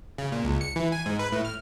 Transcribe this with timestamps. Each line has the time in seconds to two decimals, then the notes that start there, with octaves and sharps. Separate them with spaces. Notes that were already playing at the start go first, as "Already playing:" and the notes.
0.18 C#3
0.32 A#2
0.44 C#2
0.61 C#7
0.76 E3
0.92 G#5
1.06 G#2
1.19 B4
1.32 A2
1.45 F6